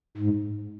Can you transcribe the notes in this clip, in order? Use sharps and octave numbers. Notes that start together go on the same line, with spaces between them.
G#2